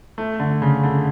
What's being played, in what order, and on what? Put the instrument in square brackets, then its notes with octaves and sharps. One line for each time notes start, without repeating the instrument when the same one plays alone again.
[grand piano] A3
D3
C#3
D3